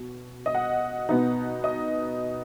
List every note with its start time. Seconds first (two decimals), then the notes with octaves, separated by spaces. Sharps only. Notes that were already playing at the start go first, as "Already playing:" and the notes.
Already playing: B2
0.46 D#5
0.54 F#5
1.09 B2 B3 D#4
1.64 D#5